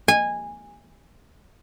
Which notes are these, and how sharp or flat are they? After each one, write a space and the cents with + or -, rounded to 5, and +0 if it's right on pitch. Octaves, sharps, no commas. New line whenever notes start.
G#5 -15